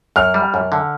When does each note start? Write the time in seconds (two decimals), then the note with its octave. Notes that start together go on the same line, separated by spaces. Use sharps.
0.16 F#2 F6
0.34 G3
0.54 F#2
0.72 D3